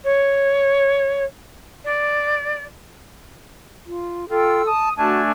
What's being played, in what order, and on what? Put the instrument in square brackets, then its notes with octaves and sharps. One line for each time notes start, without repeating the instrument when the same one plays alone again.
[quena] C#5
D5
[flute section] F4
[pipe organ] F4 [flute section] A4 G5 E6
[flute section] A5 [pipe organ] D#6
[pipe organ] A3 D4 G#5 [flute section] F#4 A5